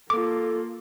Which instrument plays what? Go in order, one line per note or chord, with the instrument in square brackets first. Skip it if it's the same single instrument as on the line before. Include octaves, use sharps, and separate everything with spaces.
[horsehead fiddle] A#3 F4 [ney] A4 [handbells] D6